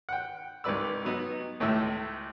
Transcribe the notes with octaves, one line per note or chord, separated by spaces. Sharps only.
F#5 G5
C2 G#2 G3 B4 D5 E6
F#3 B3 D#4
C#2 A2 A3 G4 E6